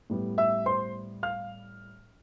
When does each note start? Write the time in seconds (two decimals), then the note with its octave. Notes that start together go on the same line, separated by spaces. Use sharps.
0.10 A2 G3 B3
0.38 E5 E6
0.66 C5 C6
1.23 F5 F6